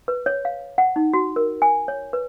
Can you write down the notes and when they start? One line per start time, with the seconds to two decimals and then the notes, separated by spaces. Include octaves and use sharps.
0.08 B4
0.26 C#5
0.45 F5
0.78 F#5
0.96 D#4
1.13 F#4
1.36 A#4
1.62 G#5
1.88 C#5
2.13 B4